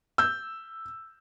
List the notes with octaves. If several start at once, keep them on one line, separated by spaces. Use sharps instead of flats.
E6 G6